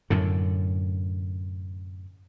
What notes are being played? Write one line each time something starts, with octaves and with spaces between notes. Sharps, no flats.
F#2 A2 D3